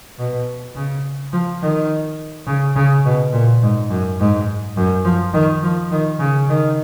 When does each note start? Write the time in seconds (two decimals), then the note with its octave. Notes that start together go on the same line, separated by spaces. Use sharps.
0.19 B2
0.76 C#3
1.33 F3
1.61 D#3
2.47 C#3
2.76 C#3
3.05 B2
3.33 A#2
3.63 G#2
3.91 F#2
4.20 G#2
4.77 F#2
5.05 F3
5.34 D#3
5.63 F3
5.92 D#3
6.20 C#3
6.49 D#3